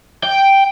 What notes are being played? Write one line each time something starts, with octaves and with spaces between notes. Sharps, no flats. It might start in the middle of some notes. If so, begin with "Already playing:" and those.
G5